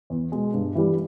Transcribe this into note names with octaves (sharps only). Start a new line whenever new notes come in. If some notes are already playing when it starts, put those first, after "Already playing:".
E2
B2 G#3
G2
E3 G3